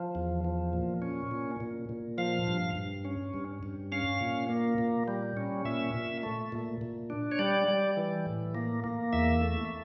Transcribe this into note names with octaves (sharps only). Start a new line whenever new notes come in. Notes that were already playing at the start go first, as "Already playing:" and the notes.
Already playing: F3
E2
F3
A#2
C#4
A#2
A#2
A#2
F3 F5
G2
G2
C#4
G2
G2
C#4 F5
A#2
A#3
A#2
G3
C#4
A#2 E5
A#2
A3
A#2
A#2
D4
C#5
G3 D5
G3
E3
A2
A#3
A#3
E2 E5
A3